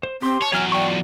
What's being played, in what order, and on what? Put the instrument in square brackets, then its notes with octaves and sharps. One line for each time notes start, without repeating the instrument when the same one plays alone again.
[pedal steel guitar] C5
[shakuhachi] C4 [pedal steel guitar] G4 C6
[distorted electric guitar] C#5 [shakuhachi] A5
[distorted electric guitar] E2 F#3 [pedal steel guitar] C#5 F6 [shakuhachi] G#5
[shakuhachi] D5 [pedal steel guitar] G5 C#6
[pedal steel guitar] F4 F#5